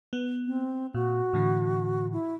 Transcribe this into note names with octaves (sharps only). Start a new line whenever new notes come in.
B3
C4
A#2 F#4
A2 D3 E3
E4